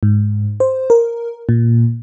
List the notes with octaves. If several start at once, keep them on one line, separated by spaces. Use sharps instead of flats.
G#2
C5
A#4
A#2